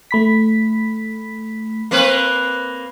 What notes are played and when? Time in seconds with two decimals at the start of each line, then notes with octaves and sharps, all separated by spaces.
0.11 A3 B5 B6
1.91 A#3 C4 B4